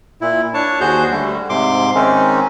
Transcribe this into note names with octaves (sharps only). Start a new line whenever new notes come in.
A#2 E4
D4 C#5 A5
D#2 F#4 G#4 C5 G6
D3 G3 A3
G#2 C3 C6 D6
D#3 G#3 C4 C#4 D#4